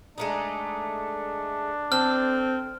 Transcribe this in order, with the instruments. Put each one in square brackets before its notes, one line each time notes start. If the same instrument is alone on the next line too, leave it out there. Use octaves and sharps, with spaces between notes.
[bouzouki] G#3 A3 D#4 [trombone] D4
[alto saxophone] C4 [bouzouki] A4 [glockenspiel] F6